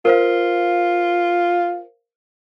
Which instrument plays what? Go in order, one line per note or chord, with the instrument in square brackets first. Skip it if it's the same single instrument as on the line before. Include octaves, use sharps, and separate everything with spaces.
[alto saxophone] F4 [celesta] A#4 C5 F5